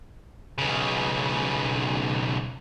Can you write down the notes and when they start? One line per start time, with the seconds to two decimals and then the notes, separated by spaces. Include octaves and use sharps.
0.58 B1 C#3